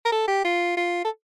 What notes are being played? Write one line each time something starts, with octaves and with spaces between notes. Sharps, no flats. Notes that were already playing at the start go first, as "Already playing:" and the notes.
A#4
A4
G4
F4
F4
A4